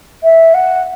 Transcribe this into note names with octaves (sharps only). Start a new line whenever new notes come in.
E5
F#5